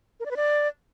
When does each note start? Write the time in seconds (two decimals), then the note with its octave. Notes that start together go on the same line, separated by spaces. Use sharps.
0.20 A#4
0.25 D5
0.31 B4
0.36 D5